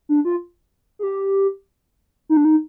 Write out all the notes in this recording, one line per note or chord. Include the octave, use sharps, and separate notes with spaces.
D4
F4
G#4
G4
D#4
D4
D#4